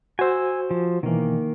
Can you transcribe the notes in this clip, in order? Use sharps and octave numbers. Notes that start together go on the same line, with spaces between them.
F#4 C5 G#5 E6
F3
B2 D#3 E3 A#3